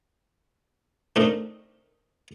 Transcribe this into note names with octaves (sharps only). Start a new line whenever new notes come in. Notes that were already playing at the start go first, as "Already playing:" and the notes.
A3 C4 D4 D#4 A#4